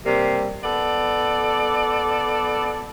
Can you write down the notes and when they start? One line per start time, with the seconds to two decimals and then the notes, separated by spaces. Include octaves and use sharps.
0.06 C3 G3 A#3
0.64 B3 A4 D5